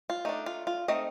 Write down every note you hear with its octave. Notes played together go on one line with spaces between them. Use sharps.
F4
A3 D4 D#4
F4
F4
A3 C4 D#4 D#5